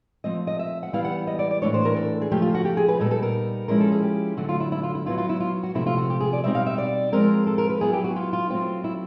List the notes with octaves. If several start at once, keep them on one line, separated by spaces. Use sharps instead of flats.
F3 A3 C4 D#5
D#5
E5
F#5
E3 G3 B3 E4 F5
F#5
D#5
D5
D5
A2 E3 A3 D4 C#5
C5
A#4
A4
G#4
C#3 F3 A3 G4
F4
F#4
G4
G#4
B4
A#2 G3 B3 D#4 A4
A4
A#4
F3 G#3 C#4 E4 A#4
A4
G#4
G4
D3 F#3 A3 F#4
F4
E4
E4
F4
E4
F#3 B3 E4 F4
F4
E4
F4
F#4
C3 F3 A3 E4
F4
F#4
G4
G#4
D5
B2 G3 C4 D#4 E5
F5
E5
D5
F3 G#3 C4 A#4
A4
A#4
B4
F#3 B3 E4 G#4
G4
F#4
F4
F4
F#3 A3 C4 F4
E4